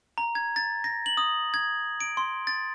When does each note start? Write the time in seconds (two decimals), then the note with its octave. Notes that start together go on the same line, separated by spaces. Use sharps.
0.18 A#5
0.35 G#6
0.56 A6
0.84 A#6
1.06 F#7
1.17 D#6
1.54 G#6
2.01 D7
2.17 C6
2.47 A6